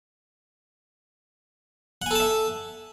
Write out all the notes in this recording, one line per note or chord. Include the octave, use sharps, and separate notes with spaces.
A4 E5 F#5 G#5 A5